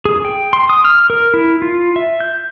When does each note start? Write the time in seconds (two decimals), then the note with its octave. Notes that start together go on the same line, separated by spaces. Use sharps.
0.05 G#4
0.25 G5
0.53 C6
0.69 D#6
0.85 F6
1.10 A#4
1.34 E4
1.62 F4
1.96 E5
2.20 G6